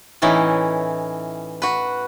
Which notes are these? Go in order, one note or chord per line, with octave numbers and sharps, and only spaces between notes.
A2 E3 C#4 D#4 E4
F#4 B4